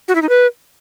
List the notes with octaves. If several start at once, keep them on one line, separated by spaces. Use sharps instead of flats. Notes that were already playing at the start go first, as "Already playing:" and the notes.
F#4
E4
D#4
B4